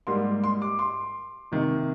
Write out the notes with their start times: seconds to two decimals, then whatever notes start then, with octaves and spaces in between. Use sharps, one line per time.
0.07 G#2 G3 A#3 C6
0.44 C6
0.62 D6
0.79 C6
1.52 C3 D#3 A#3